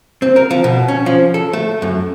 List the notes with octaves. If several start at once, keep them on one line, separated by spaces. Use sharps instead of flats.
C4
A#4
F3
B2
C#4
F3
A4
A3
F#2